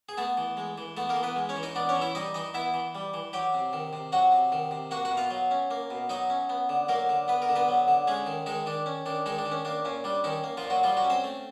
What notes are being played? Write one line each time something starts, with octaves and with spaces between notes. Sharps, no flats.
G#4
A3 B3 A4
E3
G#3
E3
A3 B3 A4
A#3 A#4
E3
B3 B4
G#3
C#4 C#5
E3
D#4 D#5
B3 D4 D5
C#4 C#5
E3
E4 E5
G3 D#4 D#5
E3 D#4 D#5
B3 E4 E5
E3
G3
E3
F#3 G4 G5
C3
D#3
C3
F#3 F#4 F#5
C3
D#3
C3
A#3 F#4 F#5
F#4 F#5
B2
F4 F5
F#3
C#4
A#3
B2
F#3 D#4 D#5
C#4
B3
D3
F#3 A#3 A#4
D3
B3 B4
A#4
D3
B3 B4
F#3
D3
G#3 C#4 G#4
D#3
D#3 G#3 D#4
D#3 D4
C#4
D#3 D4
D#3 G#3 D#4
D4
D#3
C#4
A#3 D4
A#2 C#4
G3 D4
D#3 C#4 D#4
A#3
F3 F4
A#2
F#3 F#4
F3 G3 F4
F#3 F#4
C#4
C4 C5
A3